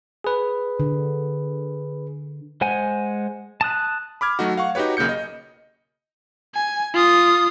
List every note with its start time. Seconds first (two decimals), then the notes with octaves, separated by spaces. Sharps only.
0.24 G#4 B4
0.80 D3
2.61 G#3 C5 F#5 G#5
3.61 A5 D#6 F#6
4.21 B5 D6 F6 G#6
4.39 F#3 A3 D#4 F#4
4.57 F5 F#5 C#6
4.75 D#4 F#4 G4 B4 C#5
4.97 B1 C#3 A#3 G6 C#7
5.09 D#5
6.55 G#5
6.94 F4 D#6